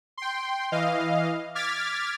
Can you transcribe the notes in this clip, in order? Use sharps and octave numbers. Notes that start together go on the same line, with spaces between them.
G5 C6
E3 D#5 F5
D6 F6 G#6 A6 B6